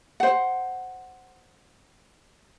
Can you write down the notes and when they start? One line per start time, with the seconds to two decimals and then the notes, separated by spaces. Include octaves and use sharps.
0.20 C5 F#5